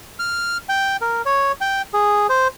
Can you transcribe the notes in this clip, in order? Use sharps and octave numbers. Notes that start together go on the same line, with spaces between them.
F6
G5
A#4
C#5
G5
G#4
C5